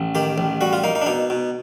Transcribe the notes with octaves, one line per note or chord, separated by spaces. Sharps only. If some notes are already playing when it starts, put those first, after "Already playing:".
Already playing: A1
D#3 G4
A1
G3 F#4
F4
A#3 D#4
D#4
D4
B2 D#4
B2